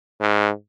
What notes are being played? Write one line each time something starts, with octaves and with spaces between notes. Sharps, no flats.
G#2